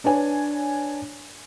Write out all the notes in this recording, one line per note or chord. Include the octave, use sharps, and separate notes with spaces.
D4 B4 C#5 G#5